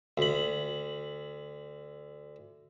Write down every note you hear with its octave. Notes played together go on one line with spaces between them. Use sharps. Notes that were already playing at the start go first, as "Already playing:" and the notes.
D2 B5